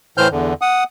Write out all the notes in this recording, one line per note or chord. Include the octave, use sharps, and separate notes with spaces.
A2 E3 C5 F6 G6
E2 D3
F#5 D#6